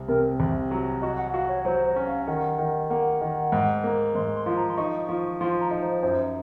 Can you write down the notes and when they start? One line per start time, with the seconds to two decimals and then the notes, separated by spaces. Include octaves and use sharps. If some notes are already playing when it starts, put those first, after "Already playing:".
Already playing: C2
0.08 C3 A#4
0.40 C2
0.71 F#3
1.02 F#4 D#5
1.18 F#5
1.33 F#4 F5
1.49 C#5
1.65 F#3 C5
1.86 C5
1.96 C#4
2.07 F5
2.27 D#3 F#5
2.58 D#3
2.90 A#3 F#5
3.21 D#3
3.52 G#2
3.84 A#3
4.15 G#2 C6
4.36 C6
4.46 F3
4.57 A#5
4.70 C6
4.77 D#4 C#6
5.09 F3
5.41 F3 C6
5.61 A#5
5.71 D#4
5.81 C5
6.03 F#2 C5